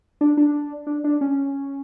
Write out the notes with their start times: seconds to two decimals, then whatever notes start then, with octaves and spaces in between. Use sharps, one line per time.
0.21 D4
0.37 D4
0.87 D4
1.04 D4
1.21 C#4